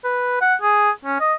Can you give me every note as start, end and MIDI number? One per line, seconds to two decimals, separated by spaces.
0.04 0.39 71
0.41 0.55 78
0.61 0.90 68
1.05 1.20 61
1.20 1.34 75